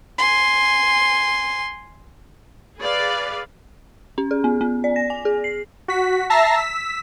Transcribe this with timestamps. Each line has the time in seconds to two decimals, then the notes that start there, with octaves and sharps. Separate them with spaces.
0.18 G#5 C6
2.80 G#4 B4 D5 F5
4.18 C#4
4.31 G#4
4.44 B3
4.61 B3
4.84 D5
4.96 A#6
5.10 G#5
5.25 G#4
5.44 C7
5.88 F#4 B6
6.30 E5 A5 A#5 E6 A#6 C7
6.55 E6 B6